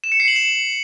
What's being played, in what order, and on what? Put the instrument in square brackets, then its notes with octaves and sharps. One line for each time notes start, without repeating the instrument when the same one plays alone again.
[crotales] E7
C#7
C7
F#7
E7